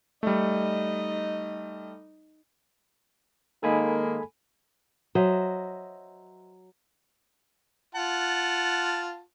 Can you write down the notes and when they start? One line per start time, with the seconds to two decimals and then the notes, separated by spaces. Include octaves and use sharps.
0.23 G3 A3 D#4 D#5
3.63 D#3 G#3 A#3 D#4 A4 G#5 B5
5.15 F#3 C5 D#5 E5
7.95 F4 F#5 A5